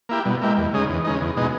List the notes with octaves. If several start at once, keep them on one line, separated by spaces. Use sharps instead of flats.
A#3 E4 G4
B2 G3
G#3 A#3 E4 G4
E2
C#3 G#3 D#4
E2 E3
C#3 G#3 D#4
E2
B2 G#3 D#4